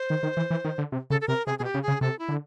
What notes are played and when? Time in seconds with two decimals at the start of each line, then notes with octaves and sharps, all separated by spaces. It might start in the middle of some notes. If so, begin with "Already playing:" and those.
Already playing: C5
0.10 D#3
0.23 D#3
0.37 E3
0.50 E3
0.65 D#3
0.78 D3
0.92 C3
1.10 C#3 A4
1.21 A4
1.28 C3 A#4
1.46 C3 G#4
1.59 B2 G#4
1.64 G4
1.74 C#3
1.83 G#4
1.88 C#3
2.01 C3 A4
2.19 E4
2.29 D3